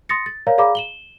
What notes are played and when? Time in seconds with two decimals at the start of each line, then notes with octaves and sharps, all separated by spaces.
0.09 C6 D#6 A6 A#6 C#7
0.26 A6
0.47 A#4 C#5 D5 F5 A#5
0.58 G#4 D5 F5 A#5 B5 D6
0.75 E7 F#7 G7